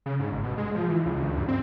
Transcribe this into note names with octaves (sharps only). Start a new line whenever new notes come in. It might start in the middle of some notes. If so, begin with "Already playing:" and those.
C#3
G#2
G1
B2
G#3
F3
E3
C#2
D2
G2
C4